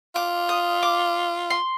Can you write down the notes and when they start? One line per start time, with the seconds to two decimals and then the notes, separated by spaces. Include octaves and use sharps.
0.15 F4 D6
0.49 D#6
0.83 D6
1.50 C6